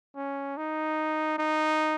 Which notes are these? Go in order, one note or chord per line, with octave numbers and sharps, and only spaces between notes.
C#4
D#4
D#4